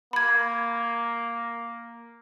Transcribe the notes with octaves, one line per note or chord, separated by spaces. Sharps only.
A#3 B5 G#6